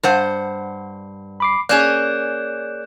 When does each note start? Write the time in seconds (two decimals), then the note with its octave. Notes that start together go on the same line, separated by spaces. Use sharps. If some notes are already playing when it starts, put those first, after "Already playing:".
0.03 G2 C5 F#5
1.40 B5 D6 C7
1.69 A#3 C#4 G#4 D5 F#6 G6 E7